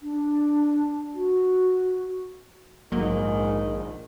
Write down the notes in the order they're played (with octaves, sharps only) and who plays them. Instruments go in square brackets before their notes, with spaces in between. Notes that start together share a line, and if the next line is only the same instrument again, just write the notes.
[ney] D4
F#4
[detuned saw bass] A#1 [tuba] G#2 [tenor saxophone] D#3 [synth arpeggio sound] F#3 A#3